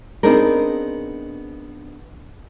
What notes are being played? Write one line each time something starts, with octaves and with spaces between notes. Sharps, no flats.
B3 C4 D4 D#4 G#4 A#4